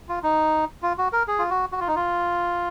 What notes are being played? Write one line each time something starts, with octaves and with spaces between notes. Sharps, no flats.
F4
D#4
F4
F#4
A#4
G#4
F4
F#4
F#4
F4
D#4
F4